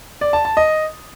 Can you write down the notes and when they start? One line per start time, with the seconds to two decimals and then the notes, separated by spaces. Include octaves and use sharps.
0.21 D5
0.33 A5
0.45 A5
0.57 D#5